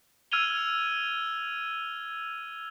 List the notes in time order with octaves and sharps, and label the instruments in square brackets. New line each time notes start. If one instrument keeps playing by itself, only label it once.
[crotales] E6 F6 G#6 D#7 F7 G7